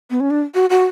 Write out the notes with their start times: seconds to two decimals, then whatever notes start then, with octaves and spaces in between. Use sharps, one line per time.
0.10 B3
0.20 C#4
0.30 D4
0.54 F#4
0.70 F#4